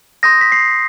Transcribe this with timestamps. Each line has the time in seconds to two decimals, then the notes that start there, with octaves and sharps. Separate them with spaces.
0.23 C6 D#6 G6 A#6
0.41 B6
0.52 C7